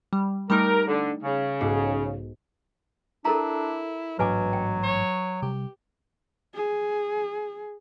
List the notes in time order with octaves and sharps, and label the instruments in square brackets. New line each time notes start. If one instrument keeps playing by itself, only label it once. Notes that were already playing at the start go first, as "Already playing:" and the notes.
[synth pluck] G3
[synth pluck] G3 A3 D#4 [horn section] A#4
[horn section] D3
C#3
[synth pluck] B1 G#2
[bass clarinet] D4 [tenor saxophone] E4 [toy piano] A4 A#4 A#5
[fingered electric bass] A1 G#2 D4 [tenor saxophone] B2 [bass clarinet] F#3 [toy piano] B4 G#5 D6
[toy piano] G5
[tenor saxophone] C#5
[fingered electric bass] C3 G3 [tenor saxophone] G4
[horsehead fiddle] G#4